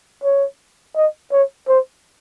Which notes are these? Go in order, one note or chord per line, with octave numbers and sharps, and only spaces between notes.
C#5
D#5
C#5
C5